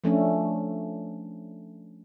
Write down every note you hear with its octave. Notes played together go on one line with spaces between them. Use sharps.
F3 A3 C#4 D4